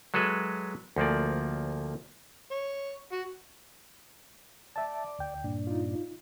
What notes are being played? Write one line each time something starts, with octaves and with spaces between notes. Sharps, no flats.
F#3 G#3 A4 B4 E5
D2 F3 A#3 D5
C#5
F#4
D5 E5 A5
D2 G5
G2 A#2 D4
D#4 F4